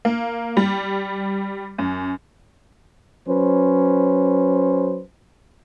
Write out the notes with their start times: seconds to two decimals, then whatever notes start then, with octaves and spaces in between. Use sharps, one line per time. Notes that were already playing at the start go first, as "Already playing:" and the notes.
0.05 A#3
0.57 G3
1.78 F#2
3.27 F#3 C#4 B4 C5